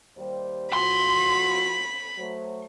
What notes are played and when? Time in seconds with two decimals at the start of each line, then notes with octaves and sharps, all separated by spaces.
0.17 D#2 G3 C5
0.73 F3 F#4 B5 C6
2.18 F#3 A3 C5